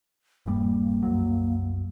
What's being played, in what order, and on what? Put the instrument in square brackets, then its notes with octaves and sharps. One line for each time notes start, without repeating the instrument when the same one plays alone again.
[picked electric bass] D#1 G2 G3 [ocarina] A#3
[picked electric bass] C2 F#2 F#3